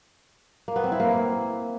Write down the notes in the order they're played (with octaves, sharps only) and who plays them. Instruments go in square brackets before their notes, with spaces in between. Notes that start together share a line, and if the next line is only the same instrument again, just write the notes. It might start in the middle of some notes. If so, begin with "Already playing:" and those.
[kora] A#3
B3
C4
E4
A#3